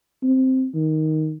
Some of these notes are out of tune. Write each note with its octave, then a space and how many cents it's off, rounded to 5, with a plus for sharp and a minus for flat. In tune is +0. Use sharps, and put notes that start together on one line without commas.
C4 +0
D#3 +5